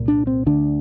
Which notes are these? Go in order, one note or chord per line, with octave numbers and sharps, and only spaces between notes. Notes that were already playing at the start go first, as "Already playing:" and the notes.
Already playing: C2 A#2
D4
C4
D2 D3 D4